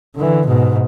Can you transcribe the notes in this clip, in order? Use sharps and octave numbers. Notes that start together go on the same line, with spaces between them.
D3 E3
G#2 B2